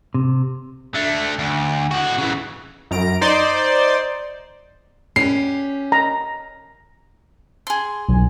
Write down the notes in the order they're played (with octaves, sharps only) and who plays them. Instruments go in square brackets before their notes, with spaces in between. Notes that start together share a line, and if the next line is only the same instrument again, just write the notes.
[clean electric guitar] C3
[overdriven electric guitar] D3 A3
D2
A2 F#4
C#3 E3
[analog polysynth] F#2 A#5 D7
D#4 C5 D5 C6
[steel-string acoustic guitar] C#4 G4 [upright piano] C7
[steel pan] A#5
[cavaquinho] G#4 C6
[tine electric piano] B1